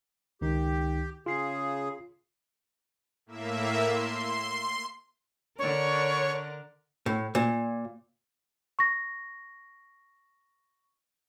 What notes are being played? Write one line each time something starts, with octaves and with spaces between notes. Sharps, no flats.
C#2 D#3 D#4 G4
C#3 F4 G#4 C7
A2 A#3 E5
C6
D3 D4 A#4 C#5
A2
A#2
C#6 A#6